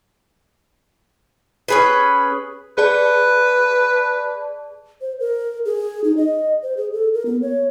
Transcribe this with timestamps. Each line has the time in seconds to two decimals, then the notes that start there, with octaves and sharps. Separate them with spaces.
1.68 C#4 G#4 B4
2.78 G#4 B4 D5 A5
5.01 C5
5.20 A#4
5.65 G#4
6.04 D#4
6.17 D#5
6.63 C5
6.77 G#4
6.93 A4
7.14 A#4
7.26 B3
7.42 C#5